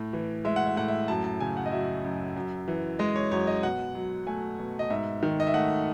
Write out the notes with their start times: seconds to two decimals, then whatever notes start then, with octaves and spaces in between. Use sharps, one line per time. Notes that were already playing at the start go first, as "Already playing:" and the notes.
Already playing: A2
0.13 E3
0.45 G#3 E5
0.56 F#5
0.67 E5
0.77 A2 F#5
0.88 E5
1.08 F#2 A5
1.24 A5
1.40 C#3 G#5
1.57 F#5
1.66 D#5
1.72 F#3 E5
2.04 F#2
2.36 F#2
2.68 E3
2.99 G#3 D#5
3.16 C#5
3.31 F#2 C#5
3.47 D#5
3.63 B2 F#5
3.95 F#3
4.27 A3 G#5
4.59 B2
4.79 D#5
4.90 G#2 E5
5.23 D#3
5.40 D#5
5.47 E5
5.54 A3 F#5